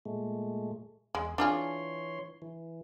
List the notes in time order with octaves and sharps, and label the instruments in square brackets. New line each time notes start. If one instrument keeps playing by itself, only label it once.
[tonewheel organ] A#2 G#3 A3
[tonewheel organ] E2 G#4 [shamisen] G#3
[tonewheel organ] E3 C#5 C6 [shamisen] D4 F4 G#4
[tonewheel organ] E3